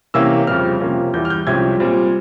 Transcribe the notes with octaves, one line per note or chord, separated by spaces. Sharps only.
C3 E3 A#3 C#4 E6
F2 C#3 G3 C4 F6
C3 F3 A#3 C#4
E2 E3 G3 G6
F6
G6
C2 C3 F3 G#3 C#4 G#6
A#2 G3 C4